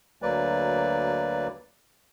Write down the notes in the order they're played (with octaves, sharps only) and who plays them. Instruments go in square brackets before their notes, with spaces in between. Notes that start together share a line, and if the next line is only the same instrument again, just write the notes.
[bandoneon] D2 F#3 A#3 B4 D5